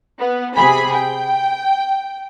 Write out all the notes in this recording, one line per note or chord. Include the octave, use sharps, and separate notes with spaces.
B3
C3 G#4 B5
G5